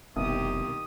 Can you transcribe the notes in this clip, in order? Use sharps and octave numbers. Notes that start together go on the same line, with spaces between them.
F1 C2 B2 D#3 A#3 G4 D#6